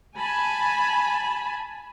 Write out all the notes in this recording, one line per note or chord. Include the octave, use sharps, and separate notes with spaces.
G#5 A5 B5